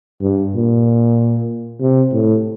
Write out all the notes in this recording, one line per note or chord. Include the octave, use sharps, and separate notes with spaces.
G2
A#2
C3
A2